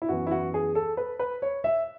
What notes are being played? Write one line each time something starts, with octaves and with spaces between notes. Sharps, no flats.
E4
F#2 E3 B3 F#4
E4
F#4
G#4
A4
B4
B4
C#5
E5